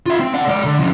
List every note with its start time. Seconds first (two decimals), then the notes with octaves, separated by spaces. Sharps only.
0.06 F4 E5
0.20 C4
0.34 D5 F#5
0.48 G#3 D5
0.65 D3
0.79 F2 C#3